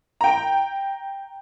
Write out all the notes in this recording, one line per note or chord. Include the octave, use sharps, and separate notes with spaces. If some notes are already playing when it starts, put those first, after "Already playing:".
G5 A#5